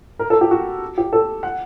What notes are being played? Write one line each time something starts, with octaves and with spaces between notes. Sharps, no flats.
A#4
A4
G4
F#4
G4
A4
F#5